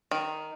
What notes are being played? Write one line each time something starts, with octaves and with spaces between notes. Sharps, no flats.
D#3